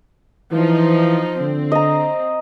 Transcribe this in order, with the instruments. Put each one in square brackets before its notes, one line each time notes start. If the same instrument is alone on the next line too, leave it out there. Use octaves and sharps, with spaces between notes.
[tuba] E3 [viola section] F3 D#4
[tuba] D3 [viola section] C4
[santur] D#5 A#5